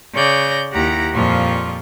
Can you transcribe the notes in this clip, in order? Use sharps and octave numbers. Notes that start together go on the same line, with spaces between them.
C#3 C#5 D5 G6 A#6
D#2 E4 G4 F#5 A#5 A#6
F2 A#2 F3 G3 F4 C#6